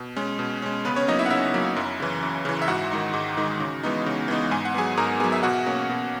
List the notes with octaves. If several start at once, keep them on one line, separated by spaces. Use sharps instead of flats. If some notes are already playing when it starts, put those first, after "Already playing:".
Already playing: B2
G#3 C#4
B2
G#3 C#4
C#3 B3 B4
C#4 C#5
F#3 A#3 D#4 D#5
E4 E5
F#5
C#3 E4 E5
F#3 A#3
F#2
C#3 E3
F#2
C#3 E3
E5
G#2 F#4 F#5
D#3 G#3 D#4
G#2
D#3 G#3 D#4
C#3
E3 G#3 B3 D#4
C#3
E3 G#3 B3 D#4
G#2 G#5
F#5
F#3 B3 G#4 G#5
G#2 A#4 A#5
F#3 B3 G#4 G#5
E5
B2 F#4 F#5
A#3 C#4
B2